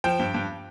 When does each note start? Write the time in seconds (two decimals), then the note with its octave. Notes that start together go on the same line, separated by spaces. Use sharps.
0.04 F3 G5
0.19 G2
0.34 G2